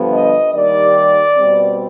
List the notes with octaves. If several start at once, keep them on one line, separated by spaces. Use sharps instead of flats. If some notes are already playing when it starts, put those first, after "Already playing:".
Already playing: G2 D3 F3 B3
D#5
D#2 D#3 G3 D5
B2 G3 C4